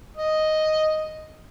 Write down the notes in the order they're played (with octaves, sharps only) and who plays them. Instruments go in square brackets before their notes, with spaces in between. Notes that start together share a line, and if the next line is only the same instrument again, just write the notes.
[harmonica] D#5